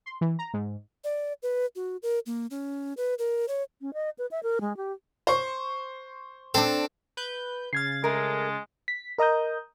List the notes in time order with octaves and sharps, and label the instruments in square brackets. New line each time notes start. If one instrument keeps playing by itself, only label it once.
[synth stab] C6
E3
A#5
G#2
[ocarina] D5
B4
F#4
A#4
A#3
C#4
B4
A#4
C#5
[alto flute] C#4
D#5
B4
E5
A#4
G#3
G4
[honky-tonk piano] C5 C#6
[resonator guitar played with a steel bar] C4 D4 [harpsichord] A4
[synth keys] B4 G6
[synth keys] C#3 A6 [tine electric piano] F6 G#6 C7
[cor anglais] G#3 [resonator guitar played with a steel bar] A3 A#4
[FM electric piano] B6
A#4 D#5 A#5 D#6 G6